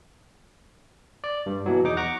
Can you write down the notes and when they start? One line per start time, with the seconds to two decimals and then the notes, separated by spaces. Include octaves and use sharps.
1.24 D5
1.46 G2
1.66 B2 E3 F#3
1.84 E2 D#4 D6
1.97 F#5 A#5 C#6 D6